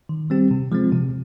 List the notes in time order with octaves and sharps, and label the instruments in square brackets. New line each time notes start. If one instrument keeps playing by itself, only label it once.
[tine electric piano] D#3
G3 C4 G4
C3
F3 G#3 C4
C3